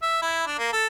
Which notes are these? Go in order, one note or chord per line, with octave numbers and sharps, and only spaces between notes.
E5
E4
D4
A#3
A4